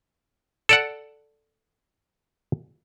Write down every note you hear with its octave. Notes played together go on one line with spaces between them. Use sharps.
A4 D5 F#5